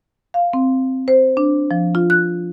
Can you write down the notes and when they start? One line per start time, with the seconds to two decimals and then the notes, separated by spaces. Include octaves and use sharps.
0.34 F5
0.53 C4
1.08 C5
1.37 D4
1.71 F3
1.95 F4
2.10 F#6